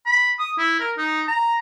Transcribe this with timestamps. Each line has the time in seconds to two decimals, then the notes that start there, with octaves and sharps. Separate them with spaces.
0.06 B5
0.39 D#6
0.58 E4
0.80 A#4
0.98 D#4
1.28 A#5